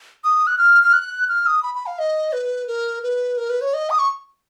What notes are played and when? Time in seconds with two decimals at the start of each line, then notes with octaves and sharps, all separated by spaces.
0.24 D#6
0.47 F#6
0.58 F6
0.83 F6
0.93 F#6
1.29 F6
1.46 D#6
1.63 B5
1.75 B5
1.86 F5
1.99 D#5
2.33 B4
2.68 A#4
3.03 B4
3.37 A#4
3.49 B4
3.61 C#5
3.74 D#5
3.90 D#6
3.99 C#6